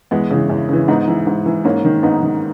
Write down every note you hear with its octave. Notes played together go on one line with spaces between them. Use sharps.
E2 G#3 B3
C#3 E3
E2
C#3 E3
G#2 B3 D#4
E3
G#2
E3
G#2 A#3 C#4
D#3
G#2 B3 D#4
D#3